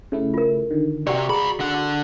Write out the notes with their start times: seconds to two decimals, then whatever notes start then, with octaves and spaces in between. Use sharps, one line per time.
0.12 C#3 A3 E4
0.34 F4 A#4
0.71 D3 D#3
1.07 C3 F#4 D5 C#6
1.29 C#2 G#4 A#5 B5
1.60 D3 F#5